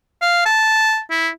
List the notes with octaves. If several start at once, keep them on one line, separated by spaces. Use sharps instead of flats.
F5
A5
E4